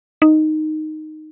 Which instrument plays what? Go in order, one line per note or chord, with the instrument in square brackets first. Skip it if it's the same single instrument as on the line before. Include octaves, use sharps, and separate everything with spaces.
[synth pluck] D#4